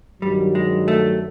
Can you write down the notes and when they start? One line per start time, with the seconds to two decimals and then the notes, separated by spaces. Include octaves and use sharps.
0.22 G2 D#3 F#3 G3
0.55 G#3
0.88 A3